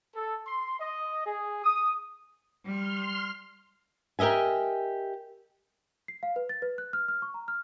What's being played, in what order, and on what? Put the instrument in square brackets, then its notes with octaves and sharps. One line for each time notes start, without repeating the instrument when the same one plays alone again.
[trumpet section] A4
C6
D#5
G#4
D#6
[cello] G3 [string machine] C6 F6
[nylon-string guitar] G4 A#4 D#5 E5 G#5
[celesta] C7
F5
B4
A6
B4
F#6
F6
F6
C#6
A#5
F6